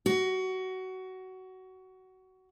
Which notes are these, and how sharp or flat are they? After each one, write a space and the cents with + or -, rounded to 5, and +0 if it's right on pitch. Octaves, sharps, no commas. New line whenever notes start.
F#4 +20